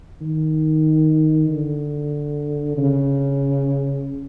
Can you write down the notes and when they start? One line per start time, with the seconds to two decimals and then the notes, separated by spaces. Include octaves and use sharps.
0.21 D#3
1.49 D3
2.77 C#3